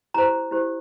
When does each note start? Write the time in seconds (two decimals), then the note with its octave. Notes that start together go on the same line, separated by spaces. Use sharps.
0.14 E4 G4 C5 A#5
0.51 E4 G4 C5